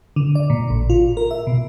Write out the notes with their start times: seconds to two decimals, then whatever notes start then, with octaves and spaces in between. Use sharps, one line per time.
0.16 D3
0.35 D5
0.50 A#2
0.70 A1
0.90 F4
1.17 A#4
1.31 E5
1.47 B2